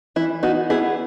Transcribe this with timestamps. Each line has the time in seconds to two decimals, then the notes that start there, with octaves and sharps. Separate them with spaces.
0.16 E3 E4
0.43 B3 D#4 F#4
0.70 B3 E4 G#4